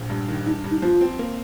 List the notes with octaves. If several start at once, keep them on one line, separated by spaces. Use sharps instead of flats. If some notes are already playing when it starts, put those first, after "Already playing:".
Already playing: A#1
G2
D#3
G2 D#4
G2
D#4
F3 F4
C4
A#3